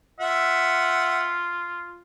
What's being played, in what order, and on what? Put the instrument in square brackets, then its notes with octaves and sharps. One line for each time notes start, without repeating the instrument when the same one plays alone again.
[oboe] F4 [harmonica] E5 F#5